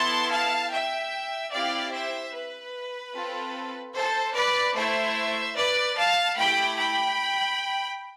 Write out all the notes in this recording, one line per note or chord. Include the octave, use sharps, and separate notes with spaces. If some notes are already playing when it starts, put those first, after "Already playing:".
Already playing: B3 E4 A4 A5 C6
F5 A5
E5 G5
C4 E4 G4 D5 F5
C5 E5
B4
C4 F4 A4
A4 C5
B4 D5
A3 E4 A4 C5 E5
B4 D5
F5 A5
A3 E4 G4 G5 B5
G5 B5